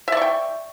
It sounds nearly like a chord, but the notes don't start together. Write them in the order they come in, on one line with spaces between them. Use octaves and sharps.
E5 D5 C#6 G5